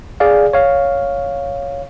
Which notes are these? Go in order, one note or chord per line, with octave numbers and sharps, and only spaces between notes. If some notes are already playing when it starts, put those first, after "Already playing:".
G#4 D5 F5
C#5 F5